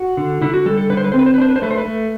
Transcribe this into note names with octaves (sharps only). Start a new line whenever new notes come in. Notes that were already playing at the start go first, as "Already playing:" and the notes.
Already playing: F#4
D3
D3 E4
F#4
G3 A4
A4
D3 B4
C5
B4
C4 C5
B4
C5
B4
D4 C5
B4
C5
A3 B4
C5
B4
A3